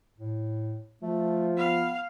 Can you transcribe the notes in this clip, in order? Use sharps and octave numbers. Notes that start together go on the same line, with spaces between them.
A2
F3 A3
B3 F5